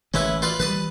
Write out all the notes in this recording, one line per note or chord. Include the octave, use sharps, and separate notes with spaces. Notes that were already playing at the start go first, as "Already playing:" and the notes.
A1 E3 G#3 C#4 E4 B4
F4 B4 D5
E3 F#3 G3 B4 A5 D#6